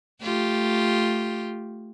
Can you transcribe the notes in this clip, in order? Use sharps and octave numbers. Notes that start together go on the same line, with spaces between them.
A3 F4 G4